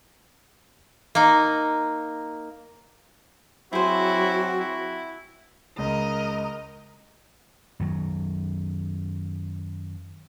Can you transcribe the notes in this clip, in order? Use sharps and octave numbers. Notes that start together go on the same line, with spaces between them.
A#3 D#4
F#3 C4 E4 F#4 G#4 C5
E4
C#2 A#4 D#5
F#2 D#3 F#3